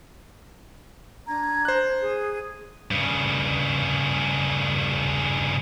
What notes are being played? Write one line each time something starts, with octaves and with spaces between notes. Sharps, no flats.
D4 A#5 G#6
C5 F#6
G#4
G2 C#3